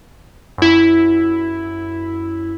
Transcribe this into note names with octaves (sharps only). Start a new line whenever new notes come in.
F#2 E4